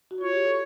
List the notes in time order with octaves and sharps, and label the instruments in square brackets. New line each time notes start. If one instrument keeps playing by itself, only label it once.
[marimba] F#4
[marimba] F4 [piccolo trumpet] C#5
[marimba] G4
A4